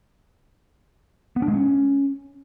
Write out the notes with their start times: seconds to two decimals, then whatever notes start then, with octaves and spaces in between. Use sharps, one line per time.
1.36 B3
1.42 D4
1.48 G#3
1.54 C#4